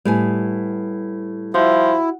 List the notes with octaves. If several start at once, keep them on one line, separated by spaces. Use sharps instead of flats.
A2 G3 B3 G#5
F3 E4 F#4